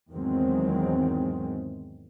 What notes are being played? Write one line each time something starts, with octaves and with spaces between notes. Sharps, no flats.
E2 G#2 D#3 F#3 G#3 C4